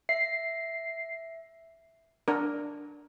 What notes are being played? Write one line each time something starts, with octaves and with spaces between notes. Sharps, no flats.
E5 C7
D4 A#4